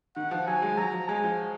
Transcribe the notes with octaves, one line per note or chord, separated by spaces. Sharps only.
D#3 F#5
F3
F#3 G#5
G#3
F#3 A#5
F3
G#3 G#5
F3